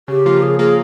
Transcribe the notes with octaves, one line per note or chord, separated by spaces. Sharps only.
C#3 G4
F3 A#3 F4
C#3 G#4
F3 A#3 F4 G#4